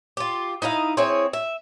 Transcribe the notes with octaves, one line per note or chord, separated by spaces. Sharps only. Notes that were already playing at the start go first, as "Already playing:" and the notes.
F4 G4
D#4 E4 D#5 F5
C4 E4 G#4 C#5
E5